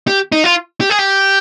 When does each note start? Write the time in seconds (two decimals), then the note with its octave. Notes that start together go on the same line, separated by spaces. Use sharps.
0.07 G4
0.32 D#4
0.44 F4
0.81 G4
0.90 G#4
0.99 G4